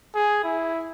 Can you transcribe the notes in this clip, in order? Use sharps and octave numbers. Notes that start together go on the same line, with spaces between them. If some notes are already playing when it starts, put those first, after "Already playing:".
G#4
E4